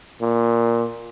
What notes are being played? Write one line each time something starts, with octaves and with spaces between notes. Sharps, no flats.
A#2